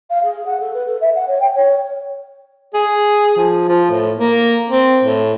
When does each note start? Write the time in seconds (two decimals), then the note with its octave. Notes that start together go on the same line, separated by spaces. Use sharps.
0.10 F5
0.23 G#4
0.45 F#5
0.60 A4
0.73 B4
0.86 A4
1.00 E5
1.15 F#5
1.27 C#5
1.40 G5
1.54 C#5
2.74 G#4
3.37 F3
3.69 F3
3.90 A2
4.17 A#3
4.69 C4
5.03 A2